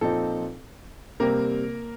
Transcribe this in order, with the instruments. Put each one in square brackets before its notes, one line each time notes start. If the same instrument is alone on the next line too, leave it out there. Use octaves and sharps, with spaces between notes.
[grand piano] A#2 F3 C4 D#4 A4
C3 G3 A#3 C4 A#4